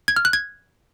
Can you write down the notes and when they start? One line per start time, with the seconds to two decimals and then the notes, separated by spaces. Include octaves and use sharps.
0.08 G#6
0.16 F6
0.25 F#6
0.33 G#6